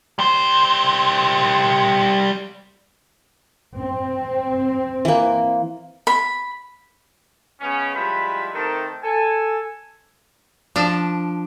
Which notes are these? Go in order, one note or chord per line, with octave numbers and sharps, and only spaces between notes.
G3 C5
C4
E3 A#3
B5
C#3 G#3 B3 C#4
F3 G3 G#3 E4 B4 B5
D#3 A3 C4 A4 A#4 A5
A4 G#5
F3 D4